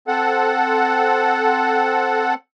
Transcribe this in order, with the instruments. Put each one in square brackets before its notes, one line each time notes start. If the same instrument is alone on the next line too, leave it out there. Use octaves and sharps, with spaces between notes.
[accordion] C4 A4 F#5